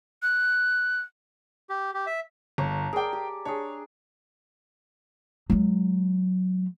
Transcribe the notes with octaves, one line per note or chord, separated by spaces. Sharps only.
F#6
G4
G4
E5
G1 C#5 A5 A#5
G#4 A#4 D5 G5
G4
D4 G#4 C#5
F#3 G#3